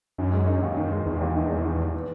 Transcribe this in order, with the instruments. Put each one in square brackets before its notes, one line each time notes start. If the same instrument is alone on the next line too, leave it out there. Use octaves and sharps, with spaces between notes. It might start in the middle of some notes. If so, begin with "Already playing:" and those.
[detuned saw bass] F#2 [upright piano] D#3
[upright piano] G#3
D#4
D#2
D#3
G#3
[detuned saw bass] E2 [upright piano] D#4
[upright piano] D#2
D#3
G#3
D#4
D#2
E3